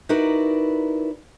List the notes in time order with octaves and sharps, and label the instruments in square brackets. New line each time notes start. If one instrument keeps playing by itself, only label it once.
[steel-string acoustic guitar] D#4 E4 F#4 A#4 B4 D5